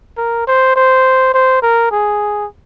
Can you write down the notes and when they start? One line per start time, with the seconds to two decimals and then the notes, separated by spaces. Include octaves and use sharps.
0.17 A#4
0.47 C5
0.76 C5
1.34 C5
1.62 A#4
1.91 G#4